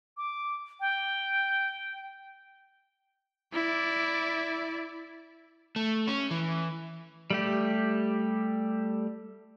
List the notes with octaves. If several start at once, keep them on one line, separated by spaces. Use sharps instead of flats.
D6
G5
E4 D5
A3
C#4
E3
G3 A3 G4